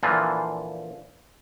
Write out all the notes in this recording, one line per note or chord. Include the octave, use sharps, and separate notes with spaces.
A#2 D3 E3 F3 F4